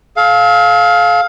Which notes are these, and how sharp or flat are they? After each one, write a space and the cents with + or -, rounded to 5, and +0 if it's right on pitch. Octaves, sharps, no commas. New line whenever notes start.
A4 -40 F5 +10